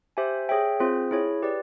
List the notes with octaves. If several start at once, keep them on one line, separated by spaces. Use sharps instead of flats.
G4 C5 E5 G#5
G#4 C#5 E5 G5
C4 F4 G#4 C5
E4 G#4 C#5
G4 B4 D5